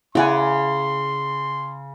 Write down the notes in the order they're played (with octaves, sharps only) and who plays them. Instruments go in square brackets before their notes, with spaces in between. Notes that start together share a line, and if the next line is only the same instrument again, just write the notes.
[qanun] C#3 D5 [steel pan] E4 F#5 G#5 [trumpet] C6